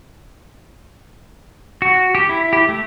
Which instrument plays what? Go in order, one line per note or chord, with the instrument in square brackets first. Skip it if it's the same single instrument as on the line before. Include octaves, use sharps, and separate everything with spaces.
[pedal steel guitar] F#4
G4
E4
G4
A3